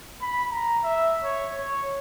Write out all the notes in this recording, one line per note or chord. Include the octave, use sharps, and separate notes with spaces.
B5
A#5
E5
C#5
C#5